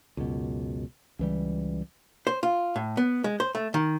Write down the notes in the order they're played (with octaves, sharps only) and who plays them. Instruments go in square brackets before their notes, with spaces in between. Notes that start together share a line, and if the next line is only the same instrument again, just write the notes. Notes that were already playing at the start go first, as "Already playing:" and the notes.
[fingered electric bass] C#2 F#2 B2
C#2 E3 G3
[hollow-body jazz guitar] C5
F4
A2
B3
G#3
C5
A3
D#3